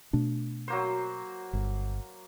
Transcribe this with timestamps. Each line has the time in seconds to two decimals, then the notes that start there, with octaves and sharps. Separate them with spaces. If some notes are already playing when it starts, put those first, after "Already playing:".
0.13 B2 A3 D4
0.68 F#3 A#3 C5
1.53 G1